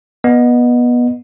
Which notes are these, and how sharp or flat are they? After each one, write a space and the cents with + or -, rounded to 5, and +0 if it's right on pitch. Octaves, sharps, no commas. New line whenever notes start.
B3 -20 D#5 -15